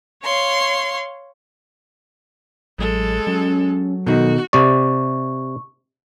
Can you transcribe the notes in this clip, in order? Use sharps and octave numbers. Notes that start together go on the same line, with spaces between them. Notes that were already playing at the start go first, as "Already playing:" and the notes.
C#5 F5 C6
A1 F#3 G#3 A4
F#3 C#4
B2 D#3 D#4 F#4 A4
C3 D5 C#6